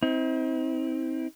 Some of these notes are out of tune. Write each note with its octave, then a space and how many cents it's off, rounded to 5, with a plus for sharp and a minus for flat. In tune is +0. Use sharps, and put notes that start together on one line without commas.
C4 +0 D#4 +45